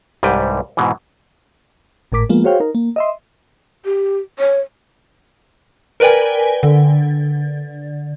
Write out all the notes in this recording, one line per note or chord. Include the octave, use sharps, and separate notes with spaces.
C2 G#2 G3 B4 G5
G#2 B2 E3
G#1 A2 A#4 D6 B6
F3 G#3 A#3 B3 F4
F#4 G#4 C5 C#5 F5 G5
D#4 A#4
A#3
D#5 E5 C6
G4
C#5
A#4 B4 D5 G5 G#5
D3